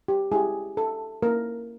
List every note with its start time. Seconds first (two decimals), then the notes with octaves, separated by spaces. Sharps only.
0.08 G4
0.32 G#3 C#4 E4 G4 G#4
0.77 A4
1.23 A#3 C#4 E4 A#4